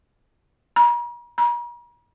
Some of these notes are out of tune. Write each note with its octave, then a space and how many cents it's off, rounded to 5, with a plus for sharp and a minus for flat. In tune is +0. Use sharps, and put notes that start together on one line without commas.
A#5 +45
A#5 +45